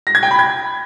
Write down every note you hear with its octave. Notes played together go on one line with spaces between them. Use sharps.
A#6
G#6
G5
B5
G#6